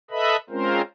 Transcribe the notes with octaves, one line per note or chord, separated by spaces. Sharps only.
A4 B4 D#5 E5 B5
G#3 C4 C#4 F4 A#4 C5